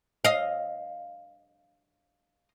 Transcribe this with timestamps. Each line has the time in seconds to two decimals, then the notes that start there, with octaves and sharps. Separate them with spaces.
0.25 D#5 F5